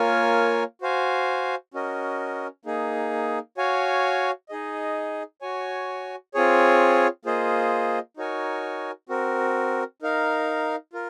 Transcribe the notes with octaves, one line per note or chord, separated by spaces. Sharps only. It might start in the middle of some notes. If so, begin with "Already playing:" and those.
Already playing: A#3 F4 A#4 C#5 G#5
F#4 C5 F5 G#5
C#4 F#4 A#4 D#5
A#3 D#4 G#4
F#4 C#5 F5 G#5
D#4 G#4 D#5
F#4 C#5 G#5
C4 F4 G#4 C#5
A#3 F4 G#4 C5 D#5
D#4 F#4 A#4 C#5 G#5
C4 F#4 A#4
D#4 A#4 F5
F4 A#4